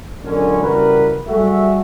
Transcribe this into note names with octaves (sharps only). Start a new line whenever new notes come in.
F#2 A#2 D3 G#3 C#4
C#3 E3 G3 F#4 A#4 B4
G3 A3 F#4 G#4 A4 E5